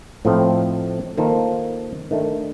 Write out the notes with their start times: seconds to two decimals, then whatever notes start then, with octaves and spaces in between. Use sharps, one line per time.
0.25 A2 F3 A3 C4 D#4
1.17 D#3 A#3 F4 A4 C5
2.11 D#3 A3 D4